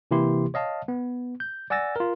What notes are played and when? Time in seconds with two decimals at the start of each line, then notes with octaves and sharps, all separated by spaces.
0.11 C3 E3 A#3 E4 G4 C6
0.54 C#5 D#5 F5 A5
0.88 B3
1.40 G6
1.70 D5 F#5 G#5 E6 A6 A#6
1.96 F4 A#4